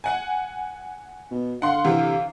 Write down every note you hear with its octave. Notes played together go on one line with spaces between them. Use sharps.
F#5 G#5
B2
D3 F5 F#5 C6
C3 E3